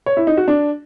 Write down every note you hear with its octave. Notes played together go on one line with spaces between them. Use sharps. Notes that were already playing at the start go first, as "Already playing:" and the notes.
C#5
E4
D#4
F#4
D4